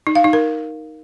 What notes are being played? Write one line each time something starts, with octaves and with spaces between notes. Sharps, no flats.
D#4
F5
D#4
A#4